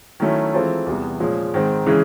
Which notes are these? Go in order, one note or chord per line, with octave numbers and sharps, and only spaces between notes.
D#3 F#3 A3 C#4 E4
E3 G#3 C4 F4 A4
E2 C3 E3 G3 B3
A#2 F3 G#3 C#4
G#2 D#3 G#3 C4
C#3 E3 G#3 C#4